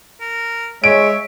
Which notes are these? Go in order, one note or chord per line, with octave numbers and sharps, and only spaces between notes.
A#4
G#3 C#5 E5 D7